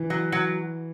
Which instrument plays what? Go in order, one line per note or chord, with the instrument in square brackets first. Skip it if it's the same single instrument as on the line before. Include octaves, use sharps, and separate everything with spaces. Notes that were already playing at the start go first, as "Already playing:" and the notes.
Already playing: [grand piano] E3
[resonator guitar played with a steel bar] F#3
F#3